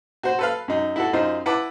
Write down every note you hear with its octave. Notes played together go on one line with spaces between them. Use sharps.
F#4 C5
A4 B4 F5
F#2 D#4
E4 F#4 A4
F#2 D#4 F4 C5
E4 B4 F#5 A5 D6